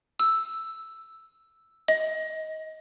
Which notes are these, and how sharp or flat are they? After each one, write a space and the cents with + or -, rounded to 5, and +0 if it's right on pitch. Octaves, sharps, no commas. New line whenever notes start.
E6 +0
D#5 +20